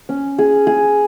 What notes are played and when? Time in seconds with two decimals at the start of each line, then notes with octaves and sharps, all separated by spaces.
0.09 C#4
0.38 G#4
0.67 G#4